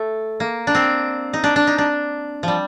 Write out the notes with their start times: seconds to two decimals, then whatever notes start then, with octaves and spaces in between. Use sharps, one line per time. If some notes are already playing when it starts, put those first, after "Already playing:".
Already playing: A3
0.40 A#3
0.67 D4
0.75 C4
1.33 D#4
1.44 D4
1.56 D4
1.67 D#4
1.78 D4
2.43 F3 G3